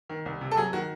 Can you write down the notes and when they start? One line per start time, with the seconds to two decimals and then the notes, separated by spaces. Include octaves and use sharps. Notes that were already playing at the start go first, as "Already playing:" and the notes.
0.09 D#3
0.26 C2
0.41 C3
0.51 A4
0.57 F#3 G#4
0.73 D#3 F#4